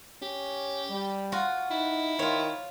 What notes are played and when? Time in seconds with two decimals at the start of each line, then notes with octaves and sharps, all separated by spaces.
0.22 C#4 G4
0.90 G3
1.32 F4 F#4
1.71 D#4 E4
2.19 D#3 F4 C#5